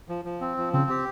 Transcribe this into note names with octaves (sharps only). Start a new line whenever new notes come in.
F3
F3
C4
F3
C#3 C4
G4